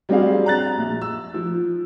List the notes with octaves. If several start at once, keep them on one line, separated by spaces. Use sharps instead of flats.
F#3 G3 C4 D4 G#4 F5
A#5 F#6 A6
A#1
E6
F3